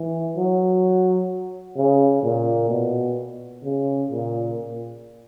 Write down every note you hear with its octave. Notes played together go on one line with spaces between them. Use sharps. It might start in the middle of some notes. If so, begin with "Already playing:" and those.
Already playing: E3
F#3
C#3
A#2
B2
C#3
A#2